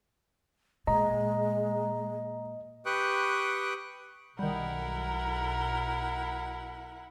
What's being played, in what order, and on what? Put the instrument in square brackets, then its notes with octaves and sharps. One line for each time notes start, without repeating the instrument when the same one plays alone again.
[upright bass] A#2 [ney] G#3 [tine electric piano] D#5 [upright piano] A#5
[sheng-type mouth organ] G4 B4 G5 C#6 D#6 F#6
[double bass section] B1 [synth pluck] D#3 G3 [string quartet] E4 F#5 [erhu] A#4